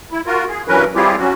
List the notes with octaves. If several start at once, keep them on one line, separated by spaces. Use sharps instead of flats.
E4
F4 F#4 A#4
G#4
G2 E3 F#3 C#4 A#4 B4
G3 C4 E4 F4 G4 G#4
F#3 C#4 F#4